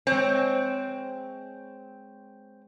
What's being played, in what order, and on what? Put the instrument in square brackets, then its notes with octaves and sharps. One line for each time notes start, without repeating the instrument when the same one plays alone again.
[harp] G#3 C#5 [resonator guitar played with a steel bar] C4